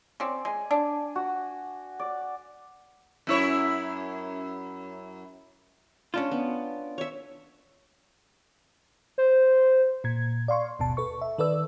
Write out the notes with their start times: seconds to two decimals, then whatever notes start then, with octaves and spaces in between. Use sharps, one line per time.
0.20 C4 C#4 D5
0.45 G#3 G#5
0.71 D4
1.16 F#4
1.99 D5
3.27 F#2 E4 C#5
6.14 C#4 D4 F4
6.32 B3
6.98 C#5 E5
9.18 C5
10.04 A#2 G#6
10.48 D5 F5 C6 C#6
10.79 G1 D#2 B2 A5
10.97 A4 B4 C#6
11.21 E5
11.38 D#3 A4 B4 D5 E6